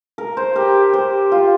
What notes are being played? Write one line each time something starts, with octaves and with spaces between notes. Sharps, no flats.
A#4
C5
G4 A#4
G4 C5
F4